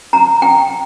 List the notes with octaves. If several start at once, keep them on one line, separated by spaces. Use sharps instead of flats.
A#5
G5